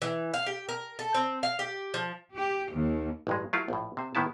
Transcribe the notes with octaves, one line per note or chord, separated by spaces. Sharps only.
E3
F5
G4
A#4
A4
C4
F5
G4
F3
G4
D#2
A1 G2 G#3
F#3 A3 E4 F4 G4 A#4
A#1 A2
C3 C5
A2 D#3 B3 E4 A5